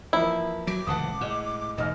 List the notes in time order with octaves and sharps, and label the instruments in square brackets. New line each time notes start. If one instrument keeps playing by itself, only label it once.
[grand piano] E3 F3 A#3 [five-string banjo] E4
[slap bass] F#3 [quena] D6 [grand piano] D7
[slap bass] D1 C#2 E3 [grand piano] F#5 A5 D#6
[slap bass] A2 [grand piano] G#3 F#5
[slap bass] E1 [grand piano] A1 G#2 F6 [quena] D#5